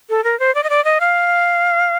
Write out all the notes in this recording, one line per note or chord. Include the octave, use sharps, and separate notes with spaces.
A4
A#4
C5
D5
D#5
D5
D#5
F5